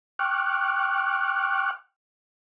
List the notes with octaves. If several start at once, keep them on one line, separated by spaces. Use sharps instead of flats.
G5 C#6 D6 F6 F#6